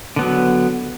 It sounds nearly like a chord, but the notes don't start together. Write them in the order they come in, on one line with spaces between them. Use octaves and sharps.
D3 B3 F#3